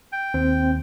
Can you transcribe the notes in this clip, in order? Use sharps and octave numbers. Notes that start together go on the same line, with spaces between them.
G5
D#2 C4